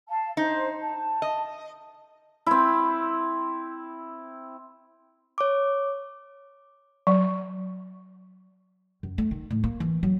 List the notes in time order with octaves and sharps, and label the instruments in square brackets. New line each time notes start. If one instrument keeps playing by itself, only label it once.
[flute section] F5 A5
[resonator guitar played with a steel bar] D#4 [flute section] C5
[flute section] A5
[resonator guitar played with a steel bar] D#5
[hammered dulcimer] C4 E4
[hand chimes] C#5 D6
[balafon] F#3
[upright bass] F#2
A3
D#3
A2
A#3
E3
F#3